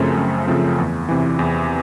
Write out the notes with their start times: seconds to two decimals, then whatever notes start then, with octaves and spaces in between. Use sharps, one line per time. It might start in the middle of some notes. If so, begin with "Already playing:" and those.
Already playing: F#2 C#3 F3 A3 C4
0.17 F#2
0.48 C#3 F3 A3 C4
0.78 E2
1.09 C3 E3
1.39 E2